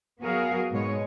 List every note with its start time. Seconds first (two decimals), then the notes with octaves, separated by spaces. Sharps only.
0.20 F#3 B3 F#4 G#4 A#4 F5
0.72 G#2 B2 G#3 C#5